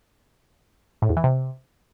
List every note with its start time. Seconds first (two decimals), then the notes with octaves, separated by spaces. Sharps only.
1.02 A2
1.09 E2
1.17 E3
1.24 C3